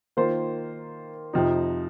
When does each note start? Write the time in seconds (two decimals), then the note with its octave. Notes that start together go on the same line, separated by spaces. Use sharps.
0.17 D#3 A#3 F4 C5
1.33 F2 C3 F3 D#4